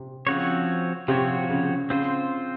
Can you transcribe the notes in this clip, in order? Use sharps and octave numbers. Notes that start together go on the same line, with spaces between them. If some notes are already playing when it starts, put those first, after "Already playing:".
Already playing: C3
C#3 F3 C4 F#4 C#5
C3 F3 C4 F#4 C#5
C#3
C#3 C4 F4 C5